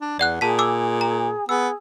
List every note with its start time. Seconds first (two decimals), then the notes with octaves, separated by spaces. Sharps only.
0.01 D4
0.19 E2 D5 F#5 F#6
0.41 A#2 G#4 A5 B6
0.59 D6 E6
1.01 A#5
1.49 B3 G#4 E6